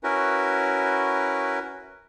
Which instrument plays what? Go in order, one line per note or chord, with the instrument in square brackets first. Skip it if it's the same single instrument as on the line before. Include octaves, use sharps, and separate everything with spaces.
[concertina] C#4 E4 F#4 A#4 B4